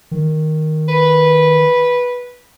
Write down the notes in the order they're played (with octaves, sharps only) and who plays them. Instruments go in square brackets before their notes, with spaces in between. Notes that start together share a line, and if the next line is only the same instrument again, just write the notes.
[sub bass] D#3
[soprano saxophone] B4